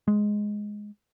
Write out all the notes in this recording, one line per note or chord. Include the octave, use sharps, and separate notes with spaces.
G#3